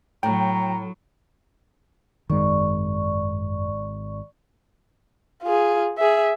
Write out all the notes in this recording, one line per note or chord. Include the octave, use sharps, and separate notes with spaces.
A2 F#3 G5 A#5
G#1 F#2 D#3 G#3 D5 C#6
F4 G#4
G#4 E5